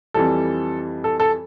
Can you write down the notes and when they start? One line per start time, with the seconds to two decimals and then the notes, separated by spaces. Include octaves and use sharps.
0.14 F2 E3 G3 A4
1.04 A4
1.20 A4